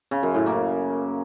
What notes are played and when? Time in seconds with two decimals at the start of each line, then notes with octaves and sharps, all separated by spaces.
0.11 C#3
0.23 F#2
0.35 A2
0.46 A#3